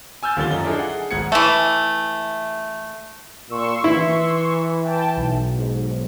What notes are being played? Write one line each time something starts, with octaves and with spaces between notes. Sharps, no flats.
G#5 E6 F6 G6 A6
D#2 D3 F3 G3 A6 G7
F#2 D#4 G7
D4 E4 F4 G#4 A4 D#5
G#4 F#5
G#1 G#2 F#5 G#6 C#7
E3 A3
A#2 C6 C#6 E6
E3 E4
G5 A5
B1
G#2